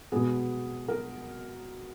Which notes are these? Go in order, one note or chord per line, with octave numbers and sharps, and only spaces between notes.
B2 G#3 B3 G#4
A#4